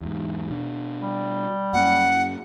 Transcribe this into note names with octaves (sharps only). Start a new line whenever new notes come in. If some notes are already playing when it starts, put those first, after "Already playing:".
E2 G#2
B2 D4
G3
F#2 A#3 C#4 F#5